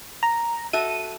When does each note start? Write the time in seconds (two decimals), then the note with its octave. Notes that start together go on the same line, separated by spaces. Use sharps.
0.23 A#5
0.73 F#4 A4 E5 D#7